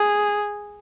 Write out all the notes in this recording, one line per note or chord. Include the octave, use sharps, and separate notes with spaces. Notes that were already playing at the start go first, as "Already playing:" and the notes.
Already playing: G#4